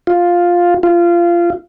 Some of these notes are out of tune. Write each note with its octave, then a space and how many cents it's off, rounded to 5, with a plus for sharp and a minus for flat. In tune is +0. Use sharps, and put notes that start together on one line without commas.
F4 +5
F4 -20